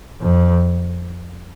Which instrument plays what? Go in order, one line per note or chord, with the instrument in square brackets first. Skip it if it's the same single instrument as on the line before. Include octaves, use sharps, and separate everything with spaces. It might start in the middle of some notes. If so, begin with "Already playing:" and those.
[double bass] F2